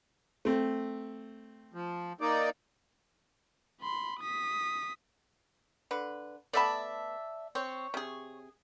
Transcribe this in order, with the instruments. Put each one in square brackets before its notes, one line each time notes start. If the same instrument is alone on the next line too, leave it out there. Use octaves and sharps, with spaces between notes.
[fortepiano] A3 C4
[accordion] F3
A#3 D#4 D5
[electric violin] B5 C6
D#6 B6
[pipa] D3 B4
[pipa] A3 B3 B5 [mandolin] D5 E5 A5
[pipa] C4 [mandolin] C#5
[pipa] C3 G#4